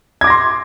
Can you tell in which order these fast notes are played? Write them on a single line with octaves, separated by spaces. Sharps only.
G#6 D6 A#6 C6